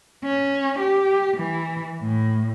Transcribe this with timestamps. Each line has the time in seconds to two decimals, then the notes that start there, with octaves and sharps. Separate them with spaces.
0.24 C#4
0.79 G4
1.37 E3
2.01 A2